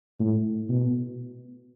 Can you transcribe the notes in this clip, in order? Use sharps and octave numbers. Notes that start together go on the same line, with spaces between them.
A2
B2